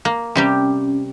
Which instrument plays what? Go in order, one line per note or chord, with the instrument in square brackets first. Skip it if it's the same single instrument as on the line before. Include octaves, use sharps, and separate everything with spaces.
[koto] A#3
[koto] C3 G3 G4 [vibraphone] C#4